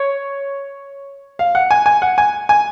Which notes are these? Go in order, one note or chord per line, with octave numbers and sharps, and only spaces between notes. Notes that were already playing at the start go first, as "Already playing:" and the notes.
Already playing: C#5
F5
F#5
G#5
G#5
F#5
G#5
G#5